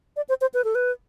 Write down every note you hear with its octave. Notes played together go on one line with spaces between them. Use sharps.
D5
C5
C5
B4
A4
B4